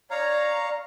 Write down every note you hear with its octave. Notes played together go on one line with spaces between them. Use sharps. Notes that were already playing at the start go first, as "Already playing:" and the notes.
C#5 D5 F5 A#5